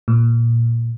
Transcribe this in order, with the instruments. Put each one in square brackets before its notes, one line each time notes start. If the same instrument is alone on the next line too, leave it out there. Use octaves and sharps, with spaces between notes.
[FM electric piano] A#2